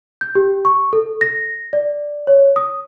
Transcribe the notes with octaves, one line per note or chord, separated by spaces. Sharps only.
G6
G4
C#6
A4
A#6
D5
C#5
D#6